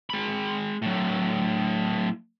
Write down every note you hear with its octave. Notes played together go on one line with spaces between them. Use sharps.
G#3 B5
A2 F#3